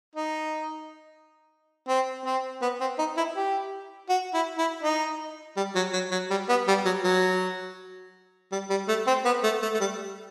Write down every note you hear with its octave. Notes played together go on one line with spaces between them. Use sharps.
D#4
C4
C4
B3
C4
D#4
E4
G4
F#4
E4
E4
D#4
G3
F#3
F#3
F#3
G3
B3
G3
F#3
F#3
G3
G3
A3
C4
B3
A3
A3
A3
G3